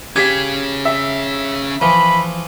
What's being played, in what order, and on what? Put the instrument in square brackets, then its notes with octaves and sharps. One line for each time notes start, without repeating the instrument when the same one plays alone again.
[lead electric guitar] C#4 G#4 [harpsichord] G4 [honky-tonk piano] G#6 B6
[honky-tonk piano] E5
[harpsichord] E3 F3 [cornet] B5